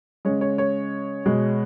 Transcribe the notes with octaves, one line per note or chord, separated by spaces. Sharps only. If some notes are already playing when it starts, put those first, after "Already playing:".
C#3 G#3 C#5
C#5
C#5
B2 G#3